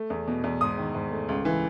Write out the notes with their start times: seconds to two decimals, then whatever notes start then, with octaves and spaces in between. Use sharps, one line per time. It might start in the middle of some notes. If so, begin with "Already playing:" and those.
Already playing: A3
0.10 E2
0.27 B2
0.44 E2
0.61 G#2 D#6
0.78 D#3
0.95 G#2
1.11 A3
1.29 C#2
1.45 E3